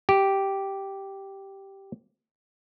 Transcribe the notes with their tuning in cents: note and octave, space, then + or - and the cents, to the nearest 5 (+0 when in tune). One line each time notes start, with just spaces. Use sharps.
G4 -5